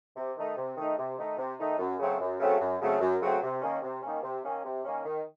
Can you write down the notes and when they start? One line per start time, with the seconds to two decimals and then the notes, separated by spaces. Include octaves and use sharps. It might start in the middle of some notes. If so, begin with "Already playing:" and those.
0.16 C3
0.36 D#3 A3 D#4
0.56 C3
0.77 D#3 A3 D#4
0.98 C3
1.18 D#3 A3 D#4
1.37 C3
1.58 D#3 A3 D#4
1.79 F#2
1.99 C#3 F#3 A3 C4
2.20 F#2
2.40 C#3 F#3 A3 C4
2.60 F#2
2.80 C#3 F#3 A3 C4
3.00 F#2
3.21 C#3 F#3 A3 C4
3.41 C3
3.62 D#3 A#3 C#4
3.82 C3
4.02 D#3 A#3 C#4
4.23 C3
4.43 D#3 A#3 C#4
4.64 C3
4.84 D#3 A#3 C#4
5.04 D#3